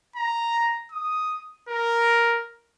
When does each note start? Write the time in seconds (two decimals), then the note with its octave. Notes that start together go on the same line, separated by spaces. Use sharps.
0.16 A#5
0.91 D#6
1.69 A#4